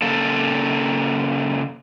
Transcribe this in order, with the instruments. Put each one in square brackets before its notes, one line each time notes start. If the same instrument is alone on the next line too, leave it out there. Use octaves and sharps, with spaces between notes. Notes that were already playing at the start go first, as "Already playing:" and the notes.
[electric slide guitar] C#3 A#3 A4